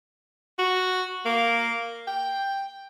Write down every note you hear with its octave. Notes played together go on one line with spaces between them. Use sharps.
F#4
A#3
G5